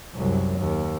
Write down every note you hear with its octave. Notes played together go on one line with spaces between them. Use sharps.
C2 F#2
D#2